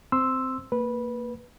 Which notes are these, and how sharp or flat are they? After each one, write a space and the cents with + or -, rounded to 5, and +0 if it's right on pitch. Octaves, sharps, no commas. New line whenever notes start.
C4 -10 C6 +0 E6 +0
A#3 -20 B4 -15